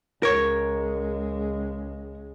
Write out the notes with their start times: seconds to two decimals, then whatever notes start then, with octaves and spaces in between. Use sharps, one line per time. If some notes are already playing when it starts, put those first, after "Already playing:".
0.23 C#2 G#3 A#4 C#5